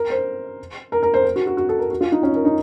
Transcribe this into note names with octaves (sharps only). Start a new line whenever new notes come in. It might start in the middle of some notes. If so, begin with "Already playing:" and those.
Already playing: A#4
C5
A#4
A#4
C5
A#4
F#4
F#4
F#4
A4
A#4
F#4
F4
D#4
C#4
A#4
D#4